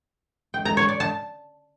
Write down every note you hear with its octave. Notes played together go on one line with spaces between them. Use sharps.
G5
A#5
C#5
D5
A5